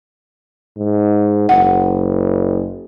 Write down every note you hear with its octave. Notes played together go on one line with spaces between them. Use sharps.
G#2
F#1 F#5